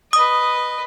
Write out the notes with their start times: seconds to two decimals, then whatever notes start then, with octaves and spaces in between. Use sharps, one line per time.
0.13 B4 D#5 D#6